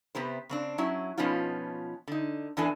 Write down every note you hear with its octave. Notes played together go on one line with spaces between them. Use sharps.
C3 B3 G4 C5
C#3 C4 D4
F#3 C#4 E4
B2 F3 B3 C#4 D#4 F4
D3 D#4
E2 A2 E3 D4 A4 G#5